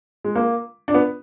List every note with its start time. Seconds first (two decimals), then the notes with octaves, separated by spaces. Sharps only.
0.24 G#3
0.35 A#3
0.88 D4
0.94 B3